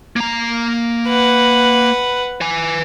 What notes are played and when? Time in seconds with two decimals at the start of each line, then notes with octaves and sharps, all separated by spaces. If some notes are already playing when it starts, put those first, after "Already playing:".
0.16 A#3 A#5
1.08 B4 F#5
2.41 B4 G#5